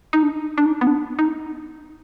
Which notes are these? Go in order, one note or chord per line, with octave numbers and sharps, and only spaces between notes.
D#4
D4
D4
D#4
B3
D4
D#4